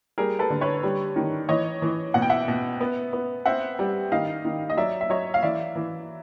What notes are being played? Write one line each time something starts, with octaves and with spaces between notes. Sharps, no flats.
G3 G#4 A#4
A4 B4
D3
B4 C#5
G3
D#3
E3 C#5 D#5
E3
B2 F#5
G5
E5 F#5
B2
B3
B3
C4 E5 F#5
G3
D#3 D#5 F5
D#3
D#5
F#3 D5 E5
E5
F#3 C#5 D#5
F5
E3 D5 E5
E3